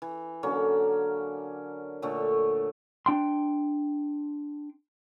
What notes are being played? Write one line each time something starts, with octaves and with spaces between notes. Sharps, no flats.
E3
D3 F#3 A#3 C#4
A#2 D3 A3 C#5
D4 G5 C6